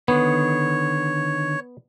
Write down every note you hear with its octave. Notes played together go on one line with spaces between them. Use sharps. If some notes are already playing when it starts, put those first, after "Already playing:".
D3 D#3 B3 C#5